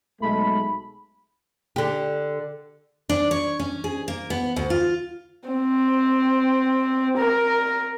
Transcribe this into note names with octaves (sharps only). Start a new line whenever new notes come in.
B1 G#3 A3 B5
D3 G4
D4
C#5
C#4
G#4
A#3
B3
D2
F4
C4
A#4